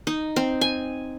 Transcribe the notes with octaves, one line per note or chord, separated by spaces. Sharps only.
D#4
C4
G#5